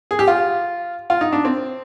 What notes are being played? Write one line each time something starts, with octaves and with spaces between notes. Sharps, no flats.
G#4
G4
F4
F4
D#4
D4
C4